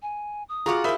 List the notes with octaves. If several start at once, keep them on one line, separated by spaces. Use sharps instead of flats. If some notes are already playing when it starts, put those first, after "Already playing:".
G#5
D#6
F4 F#4 G#4 F#5 A#5 C#6 D6
E4 A#4 C5 E5 B5 D#6